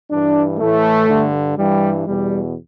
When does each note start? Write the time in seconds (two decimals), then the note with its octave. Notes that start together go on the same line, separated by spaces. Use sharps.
0.10 G2 E3 D4
0.59 A2 E3 A3
1.08 G2 D3
1.57 G2 E3 G3
2.06 E2 B2 G3